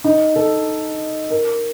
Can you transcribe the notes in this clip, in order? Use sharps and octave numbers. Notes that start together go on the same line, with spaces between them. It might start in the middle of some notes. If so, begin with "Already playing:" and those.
D#4
A4
A#4